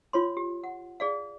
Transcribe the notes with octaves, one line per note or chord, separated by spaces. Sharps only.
F4 C#5 C6
G4
F#5
G#4 D5 F5